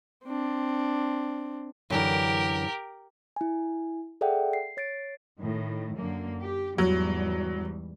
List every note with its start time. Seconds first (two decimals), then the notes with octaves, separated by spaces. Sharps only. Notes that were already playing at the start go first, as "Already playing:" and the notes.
0.25 C4 D4
1.90 F#2 D3 E3 G4 A#4
3.36 E4 G#5
4.21 G#4 A4 D5 E5 F#5 G5
4.53 C7
4.77 C#5 A6 C7 D7
5.41 A2 D#3
5.97 F#2 D3 A#3
6.41 G4
6.78 E2 G#2 F#3 G3